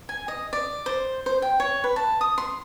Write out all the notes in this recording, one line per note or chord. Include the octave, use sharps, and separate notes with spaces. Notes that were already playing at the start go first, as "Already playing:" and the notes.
G#5
D#5
D5
C5
C5
G5
C#5
B4
A5
D#6
C6